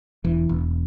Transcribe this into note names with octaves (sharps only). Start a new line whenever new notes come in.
E1 E3
E1